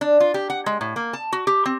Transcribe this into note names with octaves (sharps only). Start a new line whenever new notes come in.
D4
F4
G4
F#5
G#3
A2
A#3
A5
F#4
G4
C4